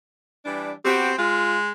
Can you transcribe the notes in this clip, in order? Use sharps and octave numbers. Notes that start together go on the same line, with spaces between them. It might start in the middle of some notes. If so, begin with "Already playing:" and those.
E3 G3 D4
B3 C4 F#4 G4
G#3 F4